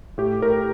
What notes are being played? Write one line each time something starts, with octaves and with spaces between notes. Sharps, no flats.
A2 G4
A2 A#4